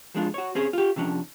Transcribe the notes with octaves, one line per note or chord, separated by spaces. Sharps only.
F3 G#3 D4 F4
F#4 C#5
C4 C#4 G#4
F4 G4
C3 F3 C#4 D4